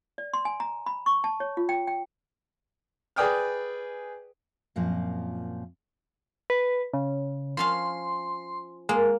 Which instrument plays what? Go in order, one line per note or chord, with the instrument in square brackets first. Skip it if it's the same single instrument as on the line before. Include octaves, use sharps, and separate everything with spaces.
[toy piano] D5
C6
G#5
A#5
B5
C#6
A5
C#5
F4
G5
G5
[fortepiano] G#4 B4 D5 G5 D#6 F6
[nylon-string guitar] F#2 A#2 F3 C4
[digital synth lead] B4
C#3
[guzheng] F3 C#4 F5 [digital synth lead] C6
[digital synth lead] G#3 [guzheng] A#3